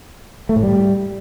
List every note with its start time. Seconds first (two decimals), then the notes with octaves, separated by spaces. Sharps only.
0.49 A3
0.56 A2
0.63 G3